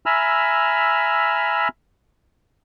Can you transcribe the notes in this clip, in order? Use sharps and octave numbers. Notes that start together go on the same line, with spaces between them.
E5 G#5 A#5 B5 E6 F6